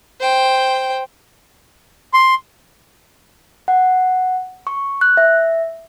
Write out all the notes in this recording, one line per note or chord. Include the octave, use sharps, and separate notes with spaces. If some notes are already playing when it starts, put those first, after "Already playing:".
C5 G5
C6
F#5
C#6
F#6
E5